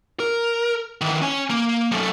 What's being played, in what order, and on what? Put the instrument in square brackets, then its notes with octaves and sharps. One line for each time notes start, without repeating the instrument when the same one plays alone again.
[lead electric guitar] A#4
D#3 E3
C#4 G#5
A#3
F#2 A3